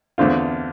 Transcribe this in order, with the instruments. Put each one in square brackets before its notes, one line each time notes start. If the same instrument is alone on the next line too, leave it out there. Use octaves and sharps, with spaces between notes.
[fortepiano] E2 D3 A3 C4 F4